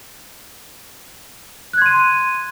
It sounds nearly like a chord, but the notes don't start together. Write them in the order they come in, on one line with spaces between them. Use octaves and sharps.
F#6 G#6 C6 D#7